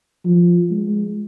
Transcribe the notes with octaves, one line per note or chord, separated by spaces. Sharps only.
F3
G#3